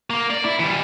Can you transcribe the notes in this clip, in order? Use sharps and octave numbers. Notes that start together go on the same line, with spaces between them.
A#3
D5
E4
E3 G3